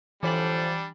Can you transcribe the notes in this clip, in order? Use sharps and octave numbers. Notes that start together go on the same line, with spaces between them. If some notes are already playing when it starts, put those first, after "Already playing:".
A2 D3 E3 F3 G3 D4 G#5 F#7